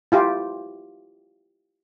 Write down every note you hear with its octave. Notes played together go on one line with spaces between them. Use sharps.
E4 F4 G4